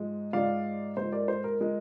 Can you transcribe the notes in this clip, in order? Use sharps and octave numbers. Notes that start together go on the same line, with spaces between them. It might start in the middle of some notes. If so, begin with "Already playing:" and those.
Already playing: G#2 F3 G#3
G#2 F3 G#3 D5 F5
G#2 F3 G#3 C5
A#4 D5
C5
A#4
F3 G#3